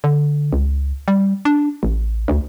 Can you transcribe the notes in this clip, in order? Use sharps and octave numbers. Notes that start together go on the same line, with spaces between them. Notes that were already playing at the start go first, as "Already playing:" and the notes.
D3
C#2
G3
D4
A1
D2